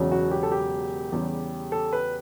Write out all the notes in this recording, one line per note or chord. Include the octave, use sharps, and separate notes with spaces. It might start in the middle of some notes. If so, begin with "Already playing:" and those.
Already playing: E1 E2 C#3 F#3
F#4
G4
A4
G4
E2 C#3 G3
A4
B4